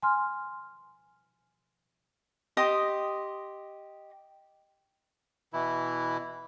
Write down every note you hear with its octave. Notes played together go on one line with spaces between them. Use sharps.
G#5 C6 F6
G4 D#5 C6 D#6
B2 E3 E4